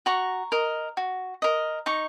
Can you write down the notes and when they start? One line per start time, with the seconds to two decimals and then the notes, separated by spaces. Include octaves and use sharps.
0.06 F#4 A#5 C#6
0.52 A#4 D#5
0.97 F#4
1.42 A#4 D#5
1.86 D#4 A#5 C#6